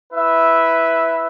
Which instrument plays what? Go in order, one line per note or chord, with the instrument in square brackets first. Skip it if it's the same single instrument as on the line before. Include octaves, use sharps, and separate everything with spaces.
[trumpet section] E4 B4 E5